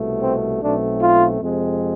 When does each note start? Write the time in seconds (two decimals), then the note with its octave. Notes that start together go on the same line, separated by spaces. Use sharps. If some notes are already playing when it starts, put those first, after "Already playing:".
Already playing: C2 B2 A3
0.20 C4
0.60 B1 B2 A3 C4 D4
1.01 F4
1.40 F2 C3 G#3 C4